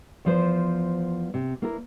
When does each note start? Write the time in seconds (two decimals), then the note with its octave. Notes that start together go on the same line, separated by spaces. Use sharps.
0.25 E2 F3 C5
1.34 C3
1.62 A#3 E4 A#4